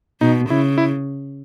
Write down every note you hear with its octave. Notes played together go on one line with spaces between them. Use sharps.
B2 D#4
C#3 E4
E4